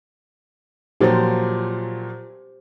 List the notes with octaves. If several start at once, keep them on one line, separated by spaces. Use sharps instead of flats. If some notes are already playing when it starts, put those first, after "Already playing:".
A#2 F3 F#3 G4 C5